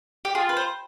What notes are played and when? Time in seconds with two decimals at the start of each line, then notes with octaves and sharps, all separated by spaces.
0.25 G4
0.35 F4 G#4
0.49 B4
0.57 C5